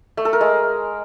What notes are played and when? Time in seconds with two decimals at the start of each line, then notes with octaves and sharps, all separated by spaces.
0.17 A3
0.25 A4
0.33 A#4
0.41 G#3